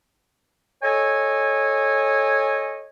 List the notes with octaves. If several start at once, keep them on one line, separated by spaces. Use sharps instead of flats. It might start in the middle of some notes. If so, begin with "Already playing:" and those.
A4 C#5 D#5 G#5